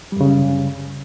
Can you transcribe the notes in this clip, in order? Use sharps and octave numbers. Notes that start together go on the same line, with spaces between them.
F#2 C#3 G3